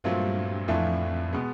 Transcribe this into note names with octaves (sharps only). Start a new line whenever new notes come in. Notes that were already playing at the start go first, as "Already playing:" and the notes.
G2 A#2 F#3 A3 C4 F4
F2 A2 E3 A3 D4 F4
B2 G#3 B3